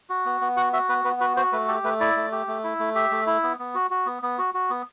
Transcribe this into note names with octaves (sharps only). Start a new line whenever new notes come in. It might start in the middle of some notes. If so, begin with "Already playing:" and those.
F#4
B3
B3
F#4 F#5
F#4 E5
B3 B4
B3 B4
F#4 B4
F#4 C5
A3 B4
G4 A4
A3 B4
E4 D5
A3
G4
A3
E4
A3
G4 E5
A3
E4
B3
B3
F#4
F#4
B3
B3
F#4
F#4
B3